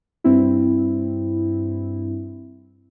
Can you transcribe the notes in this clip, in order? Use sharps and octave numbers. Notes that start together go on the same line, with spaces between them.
G2 C4 E4